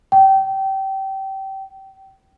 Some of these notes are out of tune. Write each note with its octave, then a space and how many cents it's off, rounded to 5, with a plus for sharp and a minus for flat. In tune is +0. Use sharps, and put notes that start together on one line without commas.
G5 -25